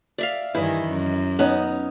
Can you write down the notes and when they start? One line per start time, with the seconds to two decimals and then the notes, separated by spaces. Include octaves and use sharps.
0.18 D5 E5 F5
0.55 G2 D#3 E3 E4 D#5
0.89 F#2
1.39 B3 C#4 D#4